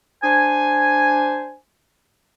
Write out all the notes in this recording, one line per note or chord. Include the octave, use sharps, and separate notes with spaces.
D4 C5 G#5